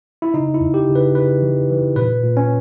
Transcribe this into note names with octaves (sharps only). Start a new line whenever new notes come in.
E4
C#3 D#4
E4
E2
G4
C#3
B4
C#3 B4
E3
E3
A#2 B4
A#2
C#4